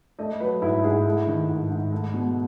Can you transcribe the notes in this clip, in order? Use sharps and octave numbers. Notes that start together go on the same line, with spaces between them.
A3 D#5
F#3 B4
G#2 E4
G#2 G#4
A3 E4
D#3
G#2
G#2
A3
B2